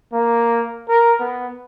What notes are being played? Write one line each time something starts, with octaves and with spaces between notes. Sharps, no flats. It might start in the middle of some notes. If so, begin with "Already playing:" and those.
A#3
A#4
B3